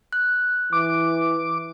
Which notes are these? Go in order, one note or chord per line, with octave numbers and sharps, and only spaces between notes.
F#6
E3 D6